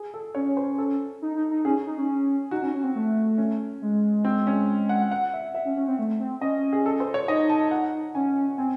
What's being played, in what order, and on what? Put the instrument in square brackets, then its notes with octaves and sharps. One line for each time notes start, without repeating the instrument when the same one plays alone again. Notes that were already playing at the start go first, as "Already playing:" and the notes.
Already playing: [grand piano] G#4
A4
[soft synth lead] C#4 [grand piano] C#5
[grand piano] C5
A4
[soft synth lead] D#4
D#4
D#4
[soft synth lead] C#4 [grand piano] G#4
[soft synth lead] D#4
C#4
[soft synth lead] D#4 [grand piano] F#4
[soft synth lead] C#4
C#4
C4
A3
[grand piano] C#4
[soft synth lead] G#3
[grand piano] C4
C#4
F#5
F#5
E5
E5
[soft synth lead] C#4
C#4
C4
A3
C4
[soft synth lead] C#4 [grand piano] D#5
[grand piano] G#4
A4
C5
C#5
[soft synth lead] D#4 [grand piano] D#5
[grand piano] A5
F#5
[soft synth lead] C#4 [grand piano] G#5
[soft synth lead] C4 [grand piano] G#5